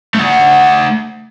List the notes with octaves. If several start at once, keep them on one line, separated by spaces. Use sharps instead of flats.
A3 F#5